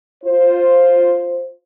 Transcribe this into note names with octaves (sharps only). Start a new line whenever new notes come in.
F4 C5